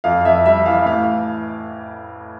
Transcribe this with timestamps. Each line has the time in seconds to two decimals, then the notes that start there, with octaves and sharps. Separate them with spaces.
0.04 F2 F5
0.25 F2 E5
0.46 G3 E5
0.66 E3 F5
0.86 A2 F5